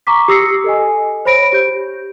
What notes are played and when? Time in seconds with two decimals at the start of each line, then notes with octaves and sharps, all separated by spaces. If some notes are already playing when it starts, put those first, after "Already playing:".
0.07 A#5 C#6 D6 B6
0.28 G4 D#6 E6 A#6 C7 C#7
0.64 A4 D#5 G#5
1.25 C5 C#5 B5 A#6 D7
1.53 G4 G6